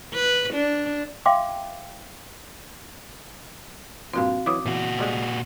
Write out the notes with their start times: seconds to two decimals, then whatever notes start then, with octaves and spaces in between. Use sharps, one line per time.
0.14 B4
0.53 D4
1.26 E5 F5 G5 C6 D6
4.14 G2 A#2 F3 C4 F#4 F5
4.46 E3 F#3 E4 D6 D#6
4.66 E2 A#2 F#4
4.99 C3 G3 G#3